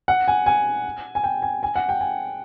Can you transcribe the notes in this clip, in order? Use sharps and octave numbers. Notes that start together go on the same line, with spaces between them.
F#5
G#5
G#5
G#5
G5
G#5
G#5
F#5
G5
G#5